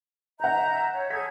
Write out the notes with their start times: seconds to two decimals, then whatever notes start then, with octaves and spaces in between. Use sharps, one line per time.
0.40 D#5 E5 F#5 A#5 G6
0.92 C#5
1.10 G#4 A4 G#6 B6